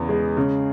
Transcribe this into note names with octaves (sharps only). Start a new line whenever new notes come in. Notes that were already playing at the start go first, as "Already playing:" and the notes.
Already playing: E2 C#3 B3
G#3
C#3